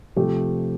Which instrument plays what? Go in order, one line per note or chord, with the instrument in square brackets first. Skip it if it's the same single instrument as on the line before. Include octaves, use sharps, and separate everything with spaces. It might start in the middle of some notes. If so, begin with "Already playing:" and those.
[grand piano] C3 F3 A3 G4